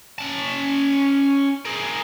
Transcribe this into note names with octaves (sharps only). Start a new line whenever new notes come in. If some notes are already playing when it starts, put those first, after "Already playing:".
C#4 A5
G#4 A#4